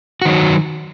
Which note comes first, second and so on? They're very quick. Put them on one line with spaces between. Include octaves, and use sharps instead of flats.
F#4 D#3 F#3